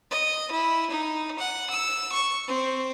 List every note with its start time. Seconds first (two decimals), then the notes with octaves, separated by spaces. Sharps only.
0.11 D#5
0.51 E4
0.90 D#4
1.39 F#5
1.70 E6
2.12 C#6
2.48 C4